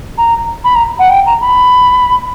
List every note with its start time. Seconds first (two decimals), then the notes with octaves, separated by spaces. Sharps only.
0.18 A#5
0.64 B5
0.75 A#5
0.99 F#5
1.10 G5
1.26 A#5
1.41 B5